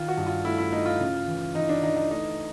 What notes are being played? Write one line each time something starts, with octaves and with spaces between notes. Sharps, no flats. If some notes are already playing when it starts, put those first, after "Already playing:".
Already playing: D#3 F4
F#4
G2
F4
A3 E4
E4
A3 D#4
F4
C#3
E3
E3 D#4
D4
E3 D#4
D#4
A3 D#4